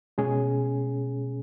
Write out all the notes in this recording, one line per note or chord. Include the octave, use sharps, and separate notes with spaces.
B2 G#3 C#4 G#4